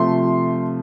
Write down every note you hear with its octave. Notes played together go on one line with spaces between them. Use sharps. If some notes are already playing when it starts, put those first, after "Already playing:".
Already playing: C3 F3 A3 C6